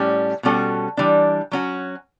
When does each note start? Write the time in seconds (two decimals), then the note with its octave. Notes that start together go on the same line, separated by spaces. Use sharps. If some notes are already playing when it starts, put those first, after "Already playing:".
Already playing: A2 G3 C#4
0.43 B2 G3 C#4 F#4 A4
0.97 E3 G3 D4
1.51 F#3 C#4 F#4